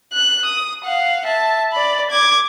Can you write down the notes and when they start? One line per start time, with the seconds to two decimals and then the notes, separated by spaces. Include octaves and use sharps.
0.14 F#6
0.45 D#6
0.84 F5 F#5
1.25 E5 A5
1.72 D5 B5
2.10 D6 G#6